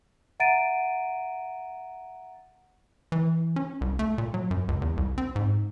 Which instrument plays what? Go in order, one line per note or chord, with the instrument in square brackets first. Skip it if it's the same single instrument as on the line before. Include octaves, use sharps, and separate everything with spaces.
[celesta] E5 F#5 A#5 A6 D7 D#7
[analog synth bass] E3
C#4
C2
A3
A#2
F#3
F#2
C#2
E2
C2
C4
G#2